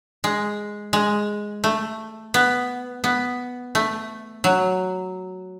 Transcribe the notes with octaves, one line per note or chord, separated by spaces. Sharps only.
G#3
G#3
A3
B3
B3
A3
F#3